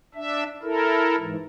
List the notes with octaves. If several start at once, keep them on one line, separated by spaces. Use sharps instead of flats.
D4 E5
E4 A4 A#4
G#2 E3